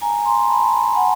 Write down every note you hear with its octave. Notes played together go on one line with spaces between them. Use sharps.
G#5 A#5
A#5 C6
A5 B5
F#5 G#5